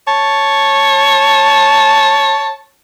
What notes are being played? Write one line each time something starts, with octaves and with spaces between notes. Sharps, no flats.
C#5 A5